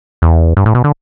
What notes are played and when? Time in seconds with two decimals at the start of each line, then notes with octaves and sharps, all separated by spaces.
0.22 E2
0.57 G2
0.66 A2
0.75 B2
0.84 D3